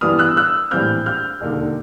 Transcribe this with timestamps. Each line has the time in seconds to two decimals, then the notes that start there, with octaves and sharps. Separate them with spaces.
0.01 G2 E3 G3 B3 D4 D#6 F6
0.19 E6 F#6
0.37 E6 F#6
0.71 A#1 A2 E3 G3 C4 F6 G6
1.06 F6 G6
1.41 E1 D#2 D3